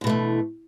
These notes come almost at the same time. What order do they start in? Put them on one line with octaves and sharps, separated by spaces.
D3 B2 A3 E3